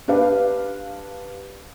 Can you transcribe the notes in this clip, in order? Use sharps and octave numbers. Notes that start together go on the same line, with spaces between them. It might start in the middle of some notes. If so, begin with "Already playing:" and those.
D4 G4 B4 F5